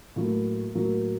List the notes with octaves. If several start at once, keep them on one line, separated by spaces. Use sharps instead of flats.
A2 F#3 A#3
A2 F#3 A#3